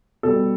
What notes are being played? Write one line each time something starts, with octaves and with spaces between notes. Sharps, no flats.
B2 G3 A4